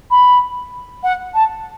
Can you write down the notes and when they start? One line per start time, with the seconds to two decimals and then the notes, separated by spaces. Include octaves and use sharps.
0.10 B5
1.03 F#5
1.34 A5